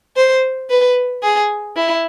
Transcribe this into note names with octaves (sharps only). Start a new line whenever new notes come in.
C5
B4
G#4
E4